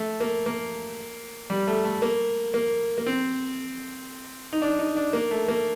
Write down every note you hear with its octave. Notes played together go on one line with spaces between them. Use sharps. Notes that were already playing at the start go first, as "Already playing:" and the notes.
Already playing: A3
A#3
A#3
G3
A3
A3
A#3
A#3
A#3
C4
D#4
D4
D#4
D4
A#3
A3
A#3